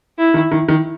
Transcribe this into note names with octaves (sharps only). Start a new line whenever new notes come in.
E4
D#3
D#3
D#3